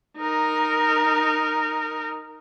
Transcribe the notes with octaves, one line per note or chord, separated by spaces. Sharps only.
D#4 A#4